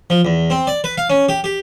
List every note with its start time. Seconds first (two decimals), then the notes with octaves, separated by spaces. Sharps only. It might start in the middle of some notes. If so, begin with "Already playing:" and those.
0.10 F3
0.25 E2
0.50 C4
0.67 D5
0.84 B4
0.98 F5
1.10 C#4
1.29 G4
1.44 G4